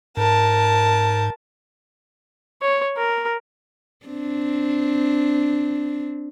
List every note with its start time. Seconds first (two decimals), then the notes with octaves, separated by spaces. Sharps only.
0.17 G#2 A#4 A5
2.62 C#5
2.97 A#4
4.06 C4 D4